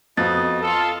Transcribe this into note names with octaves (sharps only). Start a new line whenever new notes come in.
F2 B3 F#4 D#5 A6
F4 A4 D#5